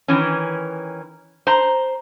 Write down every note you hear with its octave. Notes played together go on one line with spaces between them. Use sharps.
D#3 E3 C#4
C5 A#5